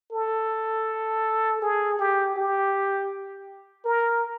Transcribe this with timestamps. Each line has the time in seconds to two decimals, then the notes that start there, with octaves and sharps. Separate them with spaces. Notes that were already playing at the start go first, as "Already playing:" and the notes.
0.12 A4
1.62 G#4
1.99 G4
2.36 G4
3.85 A#4